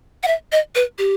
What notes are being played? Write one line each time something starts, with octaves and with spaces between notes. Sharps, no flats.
F#5
E5
D#5
B4
G4